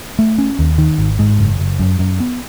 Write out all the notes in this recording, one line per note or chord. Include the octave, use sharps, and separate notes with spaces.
A3
C#4
D#2
D#3
G#1
G#2
F#1
F#1
F#2
F#2
B3